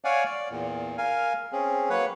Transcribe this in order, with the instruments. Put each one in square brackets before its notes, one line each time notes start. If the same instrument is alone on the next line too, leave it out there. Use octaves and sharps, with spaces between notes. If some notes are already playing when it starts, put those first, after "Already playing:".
[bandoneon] C#5 D5 F5 F#5 G#5
D5
E2 A#2
A#4 F5 G#5
C4 C#4 G#4
F#3 A#3 B4 C#5 F#5